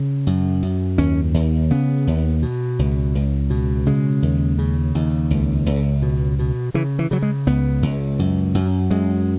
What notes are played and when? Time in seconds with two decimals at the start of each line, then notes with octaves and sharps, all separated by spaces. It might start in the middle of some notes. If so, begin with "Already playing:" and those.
Already playing: C#3
0.27 F#2
0.63 F#2
0.98 D#2 C#4
1.34 D#2
1.70 C#3 B3
2.07 D#2
2.42 B2
2.79 C#2
3.15 C#2
3.50 B2
3.86 C#3 G#3
4.22 D#2
4.59 C#3
4.95 D#2
5.31 C#2
5.66 C#2
6.02 B2
6.39 B2
6.74 C#3 E3
6.99 E3
7.11 C#3 F#3
7.22 G#3
7.47 C#2 B3
7.82 C#2
8.19 F#2
8.55 F#2
8.91 F#2 G#3